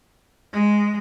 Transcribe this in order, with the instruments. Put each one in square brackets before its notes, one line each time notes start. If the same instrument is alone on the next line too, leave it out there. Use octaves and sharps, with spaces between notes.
[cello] G#3